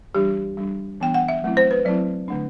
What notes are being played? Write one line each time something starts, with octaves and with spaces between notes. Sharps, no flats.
E3 G3 D4 G4
G3 D4
E3 B3 D4 G5
F#5
E5
F#3 A3 C4 E4
C5
B4
F#3 C4 E4 D5
D3 A3 D4